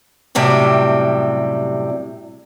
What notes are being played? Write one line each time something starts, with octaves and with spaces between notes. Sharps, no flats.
F#2 A2 C3 G3